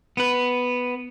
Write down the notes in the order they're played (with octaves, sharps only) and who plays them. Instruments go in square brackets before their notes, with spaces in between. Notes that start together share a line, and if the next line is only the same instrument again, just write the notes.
[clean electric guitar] B3 B4